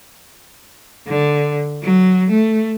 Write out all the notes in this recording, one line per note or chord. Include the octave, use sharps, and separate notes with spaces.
D3
F#3
A3